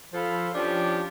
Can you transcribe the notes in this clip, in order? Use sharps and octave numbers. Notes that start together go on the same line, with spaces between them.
F3 A4 C5 F5 B5
F3 C#4 D4 G4